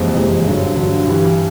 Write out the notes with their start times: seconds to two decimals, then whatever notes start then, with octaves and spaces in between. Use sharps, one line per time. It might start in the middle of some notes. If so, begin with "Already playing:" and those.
Already playing: F#1 F2 C3 E3 G#3
0.14 F#1 F2 C3 E3 G#3
0.44 G2 D3 F#3
0.75 G2 D3 F#3
1.05 G2 E3 G3